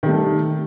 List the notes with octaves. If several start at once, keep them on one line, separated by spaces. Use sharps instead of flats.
D#3 G3 A3